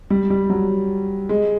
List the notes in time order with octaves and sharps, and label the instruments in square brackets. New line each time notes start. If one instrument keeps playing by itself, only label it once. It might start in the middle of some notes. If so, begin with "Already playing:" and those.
[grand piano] G3
G3
F#3
G#3